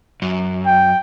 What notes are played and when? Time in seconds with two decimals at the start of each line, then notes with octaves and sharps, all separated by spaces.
0.22 F#2
0.66 G5